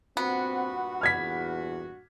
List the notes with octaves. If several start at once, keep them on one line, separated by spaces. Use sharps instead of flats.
G2 A#2 B3 C4 F#4
E2 F6 G#6 B6